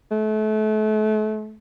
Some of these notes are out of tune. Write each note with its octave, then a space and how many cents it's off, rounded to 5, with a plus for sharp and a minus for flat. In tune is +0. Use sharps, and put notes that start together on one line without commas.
A3 -35